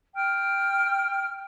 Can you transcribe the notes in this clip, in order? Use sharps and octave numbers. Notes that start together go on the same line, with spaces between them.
G5 F6